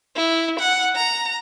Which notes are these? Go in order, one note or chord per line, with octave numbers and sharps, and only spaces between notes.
E4
F#5
A#5